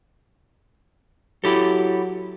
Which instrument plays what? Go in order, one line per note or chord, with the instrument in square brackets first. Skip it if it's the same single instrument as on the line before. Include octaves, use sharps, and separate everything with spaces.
[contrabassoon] F#3 [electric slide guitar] E4 G4 A4